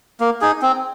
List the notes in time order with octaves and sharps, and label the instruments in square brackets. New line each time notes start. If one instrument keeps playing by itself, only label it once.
[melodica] A#3
D#4 G#4
C4